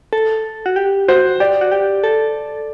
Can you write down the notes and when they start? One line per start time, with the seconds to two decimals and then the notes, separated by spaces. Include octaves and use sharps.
0.13 A4
0.66 F#4
0.76 G4
1.08 F#4 C5
1.40 G4 D5
1.61 F#4
1.72 G4
2.04 A4